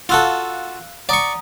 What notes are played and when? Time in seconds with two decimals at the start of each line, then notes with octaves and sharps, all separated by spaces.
0.09 F4 F#4 A4 F5 E6 F#6
1.09 D5 F#5 A#5 C#6 D#6